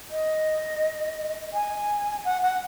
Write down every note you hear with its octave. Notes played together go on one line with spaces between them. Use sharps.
D#5
G#5
F#5
F#5